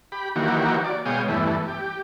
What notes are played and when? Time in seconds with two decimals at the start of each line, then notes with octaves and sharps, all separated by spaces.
0.12 G4 B5
0.36 D#3 E3 F#3 A#3 F#4 G4
0.84 D5
1.06 B2 G#3 C#5 F5 G5 D#6
1.28 E2 G2 E3 A3
1.68 G4